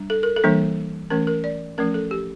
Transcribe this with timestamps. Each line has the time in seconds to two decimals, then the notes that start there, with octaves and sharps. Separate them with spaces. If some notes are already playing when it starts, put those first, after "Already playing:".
Already playing: G3 D4
0.10 A4
0.23 A#4
0.37 A4
0.44 E3 G3 A#3 D4
1.10 E3 A3 C#4 A#4
1.27 A#4
1.44 D5
1.78 F3 A3 C#4 A#4
1.94 A4
2.11 G4